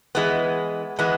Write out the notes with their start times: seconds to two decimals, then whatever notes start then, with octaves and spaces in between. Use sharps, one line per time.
0.15 E3 G#3 B3
0.99 E3 G#3 B3